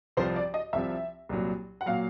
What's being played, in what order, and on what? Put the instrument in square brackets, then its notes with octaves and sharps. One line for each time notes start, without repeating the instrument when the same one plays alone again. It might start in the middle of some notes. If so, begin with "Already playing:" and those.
[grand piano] C2 C3 F3 [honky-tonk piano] C5
[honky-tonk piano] D5
D#5
[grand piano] C2 C3 F3 [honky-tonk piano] E5
[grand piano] C2 A#2 F#3
[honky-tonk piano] F#5
[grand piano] A#2 F#3 [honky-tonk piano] F5